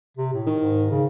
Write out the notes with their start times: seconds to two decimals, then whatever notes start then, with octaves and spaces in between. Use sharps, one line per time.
0.17 C3
0.33 A2
0.47 D#3
0.59 G#2
0.90 C#3